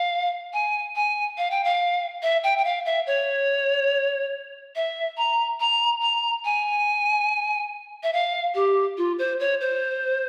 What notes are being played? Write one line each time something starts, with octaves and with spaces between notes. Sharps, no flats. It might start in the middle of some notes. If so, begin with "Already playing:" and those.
Already playing: F5
G#5
G#5
F5
G5
F5
E5
G5
G5
F5
E5
C#5
E5
A#5
A#5
A#5
G#5
E5
F5
G4
F4
C5
C#5
C5